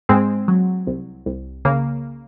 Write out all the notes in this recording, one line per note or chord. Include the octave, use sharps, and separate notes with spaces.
G#2 G#3 C4
F#3
C2
C2
C#3 A#3